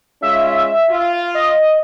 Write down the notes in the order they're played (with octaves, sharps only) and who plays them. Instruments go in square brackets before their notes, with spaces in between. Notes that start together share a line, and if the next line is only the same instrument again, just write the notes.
[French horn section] G#3 C#4 F4 [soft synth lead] E5
[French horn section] F4
[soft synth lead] D#5